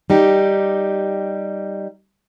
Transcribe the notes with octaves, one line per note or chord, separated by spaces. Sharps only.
G3 D#4 G4